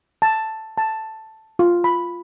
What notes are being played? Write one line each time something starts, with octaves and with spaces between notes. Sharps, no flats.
A5
A5
F4
B5